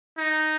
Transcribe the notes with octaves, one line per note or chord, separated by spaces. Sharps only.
D#4